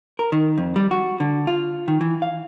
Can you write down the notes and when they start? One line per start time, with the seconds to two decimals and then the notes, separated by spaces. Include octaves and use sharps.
0.19 A#4
0.32 D#3
0.58 F2
0.76 G3
0.91 F#4
1.20 D3
1.47 F4
1.88 D#3
2.01 E3
2.22 F5